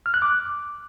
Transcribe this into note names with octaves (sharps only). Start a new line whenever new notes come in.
F6
F#6
D6